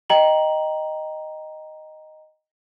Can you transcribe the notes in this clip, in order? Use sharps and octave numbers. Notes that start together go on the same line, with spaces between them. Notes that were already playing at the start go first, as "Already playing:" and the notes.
D#5 G5 A#5 F#7